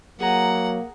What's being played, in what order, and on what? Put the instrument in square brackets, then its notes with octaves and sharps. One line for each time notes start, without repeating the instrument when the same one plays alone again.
[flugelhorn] F#3 [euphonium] A#3 [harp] G#4 A#5 [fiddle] F#5